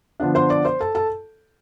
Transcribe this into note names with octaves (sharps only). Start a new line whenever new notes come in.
D3 F3 B3 D4
C5 C6
D5 D6
C5 C6
A4 A5
A4 A5